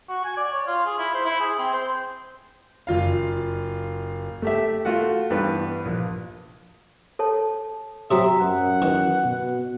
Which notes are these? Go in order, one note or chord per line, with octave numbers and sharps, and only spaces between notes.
F#4
G#5
D5
C#5
F4
G#4
E4
C5
E4
G#4
C4
C5
F#1 F4 F5
A3 G4 E5
A3 F4 F#4 F#5
G2 E3 B3 B4
A#1
A4 C#5 A5
C3 F#3 C4 E5 A#5 C6 D#6
F#2 F#5
D#3 E3
B2